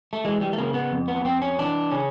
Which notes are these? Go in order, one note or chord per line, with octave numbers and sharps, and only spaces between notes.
A3
E3 G#3
G3
A3
C#3 A#3
B3
F2
B3
F2 C4
C#4
E3 D4
C#3 C#4